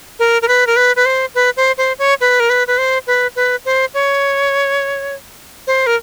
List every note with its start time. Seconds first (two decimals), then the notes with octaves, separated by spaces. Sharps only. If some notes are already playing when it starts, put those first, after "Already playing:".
0.19 A#4
0.42 A#4
0.48 B4
0.67 A#4
0.76 B4
0.96 B4
1.06 C5
1.35 B4
1.57 C5
1.78 C5
1.99 C#5
2.21 B4
2.40 A#4
2.50 B4
2.67 B4
2.78 C5
3.07 B4
3.36 B4
3.65 C5
3.94 C#5
5.67 C5
5.87 A#4